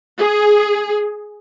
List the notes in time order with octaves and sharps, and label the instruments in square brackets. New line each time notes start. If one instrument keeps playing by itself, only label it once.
[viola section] G#4